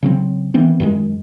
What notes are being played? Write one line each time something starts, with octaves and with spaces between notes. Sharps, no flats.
C#3 F#3 C4
D#3 E3 B3 C4
F#2 D#3 G#3